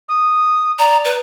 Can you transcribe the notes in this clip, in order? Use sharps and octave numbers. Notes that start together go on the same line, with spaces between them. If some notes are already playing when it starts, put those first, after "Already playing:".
D#6
D5 A#5
B4